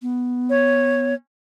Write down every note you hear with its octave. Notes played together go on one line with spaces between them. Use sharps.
B3
C#5